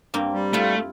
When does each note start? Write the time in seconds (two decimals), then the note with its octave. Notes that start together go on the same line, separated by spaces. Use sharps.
0.14 G2 A#3 C4
0.32 G3
0.53 A3 E4 F4